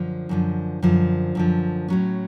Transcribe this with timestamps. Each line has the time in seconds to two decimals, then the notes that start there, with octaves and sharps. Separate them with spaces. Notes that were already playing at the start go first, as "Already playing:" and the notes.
Already playing: F#2 D3 F3
0.29 F#2 D3 F3
0.83 F#2 D3 F3
1.35 F#2 D3 F3
1.88 A2 F#3 C#4